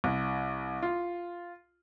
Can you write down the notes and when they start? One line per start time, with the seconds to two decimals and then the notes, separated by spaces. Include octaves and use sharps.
0.04 C2
0.82 F4